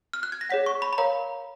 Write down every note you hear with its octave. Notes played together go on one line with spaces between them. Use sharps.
F6
F#6
G#6
A#6
G#4 C#5 F#5 B6
C#6
B5
B5
A#4 C#5 F5 A#5